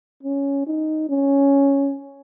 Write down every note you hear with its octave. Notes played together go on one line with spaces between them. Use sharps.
C#4
D#4
C#4